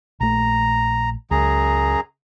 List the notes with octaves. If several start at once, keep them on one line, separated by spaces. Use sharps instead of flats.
A#1 A3 A#5
C#2 F#2 G#4 A#5